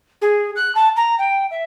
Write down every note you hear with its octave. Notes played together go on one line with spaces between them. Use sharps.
G#4
F#6
A5
A#5
G5
E5